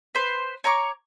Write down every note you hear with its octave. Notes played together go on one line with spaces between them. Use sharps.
B4 C5
C#5 A#5 C#6 D6